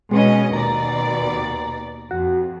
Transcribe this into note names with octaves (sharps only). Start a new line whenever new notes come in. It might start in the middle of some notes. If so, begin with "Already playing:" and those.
B2 G#3 C#4 D#5
D#2 B2 D5 A#5
F2 F#4